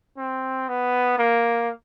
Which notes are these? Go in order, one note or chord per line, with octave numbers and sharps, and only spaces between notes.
C4
B3
A#3